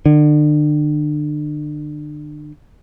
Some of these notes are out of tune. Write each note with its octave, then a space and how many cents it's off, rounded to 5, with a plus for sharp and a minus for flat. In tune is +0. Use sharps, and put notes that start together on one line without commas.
D3 +35